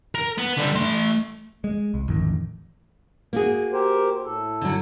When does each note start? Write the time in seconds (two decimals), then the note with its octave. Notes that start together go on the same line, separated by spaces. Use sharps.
0.15 A#4
0.38 B3
0.57 D3 G3
0.75 A3 C6
1.64 G#3
1.94 C2
2.09 A1 F2 D#3
3.33 A#3 F#4 G#4
3.72 G4 A#4 C5
4.24 A2 A4
4.61 D3 F#3